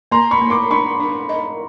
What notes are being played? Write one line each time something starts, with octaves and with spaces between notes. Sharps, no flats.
A#3 A#5 C6
B5 C#6
A#3
C6 D6
D4 B5 C#6
D4
D#5